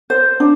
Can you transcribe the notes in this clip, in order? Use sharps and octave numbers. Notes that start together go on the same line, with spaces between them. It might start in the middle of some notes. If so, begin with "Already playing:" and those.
C5
D4